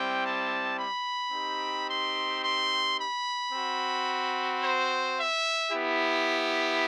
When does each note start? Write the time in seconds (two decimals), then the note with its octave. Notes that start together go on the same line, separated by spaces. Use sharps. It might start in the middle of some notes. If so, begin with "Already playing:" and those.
Already playing: G3 C4 E4 G5
0.23 A5
0.77 B5
1.32 C4 D#4 G4
1.87 C6
2.42 C6
2.97 B5
3.52 C4 F#4
4.62 C5
5.17 E5
5.71 B3 E4 G4